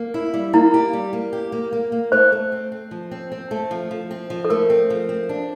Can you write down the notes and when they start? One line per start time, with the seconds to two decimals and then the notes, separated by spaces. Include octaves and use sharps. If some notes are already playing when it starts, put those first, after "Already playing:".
Already playing: A#3
0.14 E4
0.34 G3
0.53 A#3 E4
0.74 G4
0.93 G3
1.13 A#3
1.33 G4
1.52 A#3
1.73 A#3
1.92 A#3
2.12 A3 C5
2.32 A3
2.52 C4
2.72 C4
2.91 F3
3.11 C4
3.32 C4
3.51 A3
3.71 F3
3.91 F3
4.11 C4
4.30 F3
4.45 A4
4.50 A3 A#4
4.70 C4
4.90 F3
5.09 C4
5.29 D4